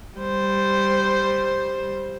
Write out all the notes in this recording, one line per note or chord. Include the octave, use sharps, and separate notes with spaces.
G3 C5